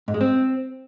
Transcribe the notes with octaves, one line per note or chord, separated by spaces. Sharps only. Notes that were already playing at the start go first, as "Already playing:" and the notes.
G#2
G#3
C4